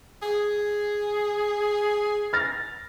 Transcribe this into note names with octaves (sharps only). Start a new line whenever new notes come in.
G#4
F6 A6 A#6